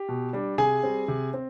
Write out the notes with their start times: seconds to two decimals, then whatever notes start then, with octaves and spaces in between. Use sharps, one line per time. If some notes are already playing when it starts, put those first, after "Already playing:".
Already playing: G4
0.09 B2
0.33 G3 D4
0.58 C3 G#4 G#5
0.83 G3 C4
1.08 C3
1.34 C4